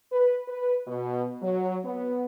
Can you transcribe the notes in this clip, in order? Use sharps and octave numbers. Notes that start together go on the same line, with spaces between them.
B4
B4
B2
F#3
B3